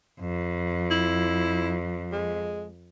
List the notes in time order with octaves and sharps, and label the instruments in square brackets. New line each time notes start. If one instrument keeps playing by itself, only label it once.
[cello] F2
[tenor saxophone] E4
G#3